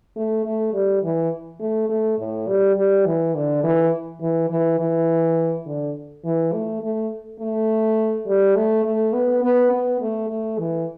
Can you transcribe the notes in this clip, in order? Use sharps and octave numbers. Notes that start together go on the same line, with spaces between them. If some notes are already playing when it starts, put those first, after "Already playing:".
A3
A3
G3
E3
A3
A3
A2
G3
G3
E3
D3
E3
E3
E3
E3
D3
E3
A3
A3
A3
G3
A3
A3
B3
B3
B3
A3
A3
E3